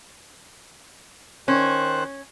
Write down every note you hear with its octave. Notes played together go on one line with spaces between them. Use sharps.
D#3 C#4 C5 F#6